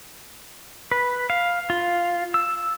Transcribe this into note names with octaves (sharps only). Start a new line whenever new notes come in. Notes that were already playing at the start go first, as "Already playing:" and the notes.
B4
F5
F4
E6